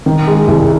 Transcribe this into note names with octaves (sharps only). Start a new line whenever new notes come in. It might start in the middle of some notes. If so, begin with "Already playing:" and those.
D#3
G#3
C2